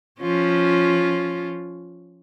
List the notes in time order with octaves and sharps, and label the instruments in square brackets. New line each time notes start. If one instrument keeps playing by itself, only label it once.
[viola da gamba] F3 C#4 F4